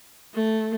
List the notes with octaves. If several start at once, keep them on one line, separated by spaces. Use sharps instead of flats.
A3